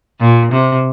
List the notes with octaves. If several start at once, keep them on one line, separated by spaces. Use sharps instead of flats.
A#2
C3